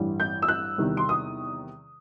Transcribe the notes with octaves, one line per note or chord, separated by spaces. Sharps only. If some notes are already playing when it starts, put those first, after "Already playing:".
Already playing: A1 G2 E3 G3
G6
E6
F#6
E2 C3 D#3 G3
C6
D#6